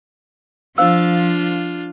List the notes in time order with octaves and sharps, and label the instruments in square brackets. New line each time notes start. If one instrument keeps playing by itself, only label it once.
[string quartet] F3 [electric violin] D4 F4 [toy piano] C5 F5 E6